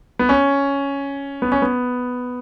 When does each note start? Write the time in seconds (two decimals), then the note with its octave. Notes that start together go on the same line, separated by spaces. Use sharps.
0.19 B3
0.29 C#4
1.42 B3
1.52 C#4
1.62 B3